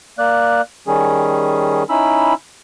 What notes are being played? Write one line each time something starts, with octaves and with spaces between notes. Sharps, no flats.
A#3 D5 F#6
D#3 G3 C#4 G#4
C#4 D#4 E4 B5 E6